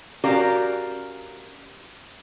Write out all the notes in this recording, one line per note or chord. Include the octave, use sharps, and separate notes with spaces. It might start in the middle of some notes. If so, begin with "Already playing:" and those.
C#4 F#4 G4 A#4 D5 F5